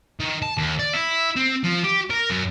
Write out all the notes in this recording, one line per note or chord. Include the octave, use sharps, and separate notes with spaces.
D#3
A5
D#2
D5
E4
C4
F3
G4
A#4
F#2